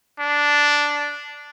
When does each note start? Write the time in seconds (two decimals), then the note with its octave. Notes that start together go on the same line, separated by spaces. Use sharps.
0.19 D4